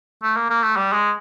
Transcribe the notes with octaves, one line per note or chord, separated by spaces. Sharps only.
A3
A#3
A#3
A3
G3
G#3